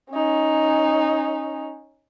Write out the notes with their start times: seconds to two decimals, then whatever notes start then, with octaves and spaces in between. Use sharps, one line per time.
0.10 C#4 D#4